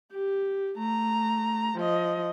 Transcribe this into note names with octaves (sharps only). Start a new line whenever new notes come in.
G4
A3 A#5
F3 D#5